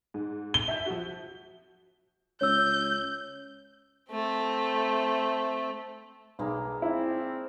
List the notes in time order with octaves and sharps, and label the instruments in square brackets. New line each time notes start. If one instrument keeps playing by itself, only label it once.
[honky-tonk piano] G#2
[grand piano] G7
[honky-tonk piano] E5 G6
F3 F#4
[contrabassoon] C#2 [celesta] C#5 E6 [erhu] G6
[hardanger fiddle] A3 C4
[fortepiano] B1 [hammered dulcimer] G#3 A#3 D4
[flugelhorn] C4 [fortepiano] E4